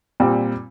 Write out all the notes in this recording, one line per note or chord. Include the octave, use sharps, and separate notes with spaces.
A#2 G3 C4